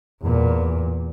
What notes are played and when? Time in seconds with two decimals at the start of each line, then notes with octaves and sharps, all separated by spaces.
0.23 E2 A#2